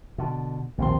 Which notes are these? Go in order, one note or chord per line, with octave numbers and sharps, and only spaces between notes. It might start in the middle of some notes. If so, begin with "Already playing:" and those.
B2 D3
A#1 D#2 A2 C4 C6